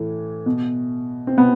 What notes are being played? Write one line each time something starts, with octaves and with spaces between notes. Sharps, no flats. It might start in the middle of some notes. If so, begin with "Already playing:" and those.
Already playing: A2 E3
B2
C4
B2 B3